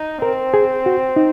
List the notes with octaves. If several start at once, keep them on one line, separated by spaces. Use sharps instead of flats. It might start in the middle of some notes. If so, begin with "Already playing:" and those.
Already playing: D#4
C4 A#4
G#4
F#4
D#4